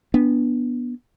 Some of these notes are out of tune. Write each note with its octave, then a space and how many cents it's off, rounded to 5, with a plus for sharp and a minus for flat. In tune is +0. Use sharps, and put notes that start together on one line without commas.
B3 -15 D4 +0